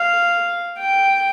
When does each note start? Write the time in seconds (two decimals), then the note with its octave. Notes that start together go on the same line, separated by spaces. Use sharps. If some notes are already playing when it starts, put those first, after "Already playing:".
Already playing: F5
0.79 G5